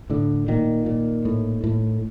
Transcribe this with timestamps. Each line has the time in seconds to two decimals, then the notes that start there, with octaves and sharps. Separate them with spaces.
0.10 A2 D3
0.48 A#2 D#3
0.86 A#2
1.25 A2
1.64 A2